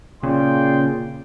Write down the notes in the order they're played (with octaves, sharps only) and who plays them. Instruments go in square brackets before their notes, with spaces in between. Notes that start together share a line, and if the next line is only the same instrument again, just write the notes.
[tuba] A#2 [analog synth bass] C#3 [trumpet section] D5 G5 C6